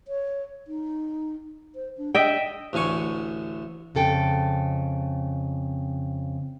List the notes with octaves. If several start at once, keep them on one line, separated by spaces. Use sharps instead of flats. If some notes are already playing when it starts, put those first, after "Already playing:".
C#5
D#4
C5
D4
D4 D#5 E5 G5
A1 D2 D3 G#5 C#6
F2 C#3 A4 G5